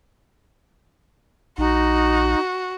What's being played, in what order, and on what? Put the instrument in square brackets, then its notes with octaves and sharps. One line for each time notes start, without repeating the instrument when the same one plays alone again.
[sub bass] A#1 [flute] D#4 [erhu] F#4